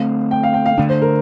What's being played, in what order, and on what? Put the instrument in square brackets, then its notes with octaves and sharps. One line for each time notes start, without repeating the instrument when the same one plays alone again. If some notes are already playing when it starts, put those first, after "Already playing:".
Already playing: [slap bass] D3 A3 C4 [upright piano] F5
[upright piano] G5
F5
G5
F5
[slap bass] D3 A3 D4
[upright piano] C5
A#4